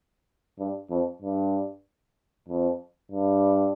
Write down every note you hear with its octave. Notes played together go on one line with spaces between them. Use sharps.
G2
F2
G2
F2
G2